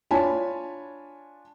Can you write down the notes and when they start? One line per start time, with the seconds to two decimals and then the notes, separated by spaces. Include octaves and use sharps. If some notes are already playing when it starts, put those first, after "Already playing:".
0.11 D4 F4 C#5 G#5 A5 B5